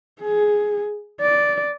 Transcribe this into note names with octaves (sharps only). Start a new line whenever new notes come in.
G#4
D5